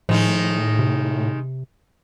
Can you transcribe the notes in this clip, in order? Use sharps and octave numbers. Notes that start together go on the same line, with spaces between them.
A2 D#3 F3 G#3 D#4
C3